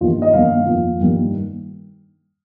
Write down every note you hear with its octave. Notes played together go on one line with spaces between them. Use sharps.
G2 D#3 G3 A#3 F4
D#5
G2 D#3 A#3 F5
F2 F3 A#3
G2 D#3 G3 A#3